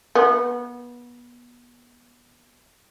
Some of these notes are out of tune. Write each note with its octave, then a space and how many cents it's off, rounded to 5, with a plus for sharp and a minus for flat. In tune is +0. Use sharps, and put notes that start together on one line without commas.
B3 -25